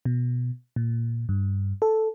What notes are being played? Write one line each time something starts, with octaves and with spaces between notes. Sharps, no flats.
B2
A#2
G2
A4